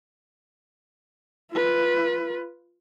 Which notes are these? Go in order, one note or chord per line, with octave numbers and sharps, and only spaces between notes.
F4 B4